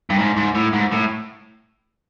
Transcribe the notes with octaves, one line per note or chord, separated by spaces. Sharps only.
G2
G#2
G#2
A2
G#2
A2